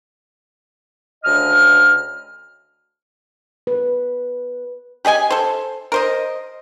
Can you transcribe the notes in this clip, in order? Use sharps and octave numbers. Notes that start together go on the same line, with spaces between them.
D2 C#3 D#5 F6
B4
G4 G#4 D#5 G#5
A4 C5
A#4 C5 D#5